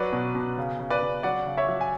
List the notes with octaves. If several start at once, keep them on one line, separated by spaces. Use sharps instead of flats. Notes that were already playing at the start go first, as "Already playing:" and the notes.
Already playing: F#3 B4 D5
B2
B2
C#3
C#3
B4 D5
C#3
F#3 D5 F#5
C#3
C#5 E5
F#3
G#5